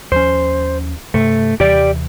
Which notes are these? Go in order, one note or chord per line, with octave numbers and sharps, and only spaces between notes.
D#2 F3 C#4 C5
G2 C3 A3
D#2 C3 E3 G4 D5